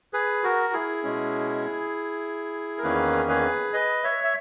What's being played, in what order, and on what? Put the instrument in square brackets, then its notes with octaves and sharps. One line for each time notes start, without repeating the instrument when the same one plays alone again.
[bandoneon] G#4 B4
F#4 A#4
E4 G#4
B2 G#3 C#4
A#4
E2 D#3 A#3 C#4 G#4 B4
G#4 B4
B4 D#5
C#5 E5
E5